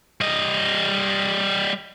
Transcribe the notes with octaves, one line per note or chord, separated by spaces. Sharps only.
G3 D#5